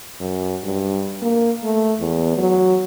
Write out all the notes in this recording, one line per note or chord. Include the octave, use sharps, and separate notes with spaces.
F#2
G2
A#3
A3
E2
F#3